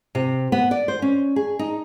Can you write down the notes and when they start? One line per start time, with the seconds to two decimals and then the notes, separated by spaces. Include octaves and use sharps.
0.15 C3
0.52 B3
0.71 D5
0.88 C5
1.02 C#4
1.36 G#4
1.59 D#4